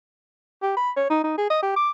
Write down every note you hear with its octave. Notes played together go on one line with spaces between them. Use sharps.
G4
B5
C#5
D#4
D#4
G#4
D#5
G4
D6